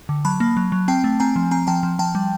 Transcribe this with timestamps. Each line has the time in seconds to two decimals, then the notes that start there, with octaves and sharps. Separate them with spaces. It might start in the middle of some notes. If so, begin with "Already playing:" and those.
0.09 D3
0.25 F#3 A5 B5
0.40 A#3
0.57 F#3
0.72 F#3
0.88 C4 G5 A5
1.04 A3
1.20 C4 G#5 A#5
1.36 F3
1.51 C4 G#5 A#5
1.67 F3 G5 A5
1.83 F3
1.99 F3 G5 A5
2.15 G3